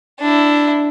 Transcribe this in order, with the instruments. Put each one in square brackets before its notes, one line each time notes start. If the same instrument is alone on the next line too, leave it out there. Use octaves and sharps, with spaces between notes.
[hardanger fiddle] D4 E4